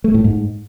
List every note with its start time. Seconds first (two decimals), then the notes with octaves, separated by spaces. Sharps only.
0.04 A3
0.14 A2
0.24 G#2